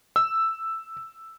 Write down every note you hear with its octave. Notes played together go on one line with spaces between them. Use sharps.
E6